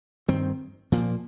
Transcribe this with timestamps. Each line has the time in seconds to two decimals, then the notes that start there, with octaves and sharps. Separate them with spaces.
0.28 G2 D#3 C4
0.92 A#2 F3 A#3